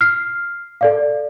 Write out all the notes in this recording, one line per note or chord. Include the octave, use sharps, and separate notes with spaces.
F6 C7
A4 D5 F5